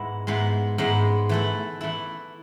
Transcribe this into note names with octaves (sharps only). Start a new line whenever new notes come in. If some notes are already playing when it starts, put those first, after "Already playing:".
Already playing: G#2 G#3 B3 E4
G#2 G#3 B3 E4
G#2 G#3 B3 E4
E3 A3 E4
E3 A3 E4